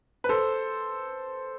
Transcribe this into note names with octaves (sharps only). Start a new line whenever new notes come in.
B4
A4 C5